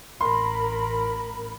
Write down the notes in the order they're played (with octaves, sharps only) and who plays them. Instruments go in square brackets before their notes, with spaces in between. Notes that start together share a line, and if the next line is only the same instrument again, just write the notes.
[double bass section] A1 [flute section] A#4 B5 [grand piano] C6